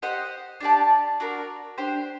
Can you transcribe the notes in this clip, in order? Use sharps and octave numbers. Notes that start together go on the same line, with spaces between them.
G4 C5 D#5 F#5
D4 G4 D5 A5
D4 F#4 A#4
D4 G4 C5